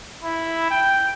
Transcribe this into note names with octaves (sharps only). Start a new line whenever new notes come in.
E4
G5